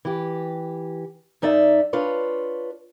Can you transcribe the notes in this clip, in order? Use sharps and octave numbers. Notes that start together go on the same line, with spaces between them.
E3 G4
F#2 D#4 D5 E5
D4 F4 B4 C#5